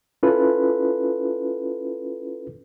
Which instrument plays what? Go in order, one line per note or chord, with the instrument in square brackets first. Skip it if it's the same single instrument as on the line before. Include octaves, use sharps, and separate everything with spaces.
[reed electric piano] C#4 E4 F4 A4 B4